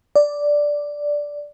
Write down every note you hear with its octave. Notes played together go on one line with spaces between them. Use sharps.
D5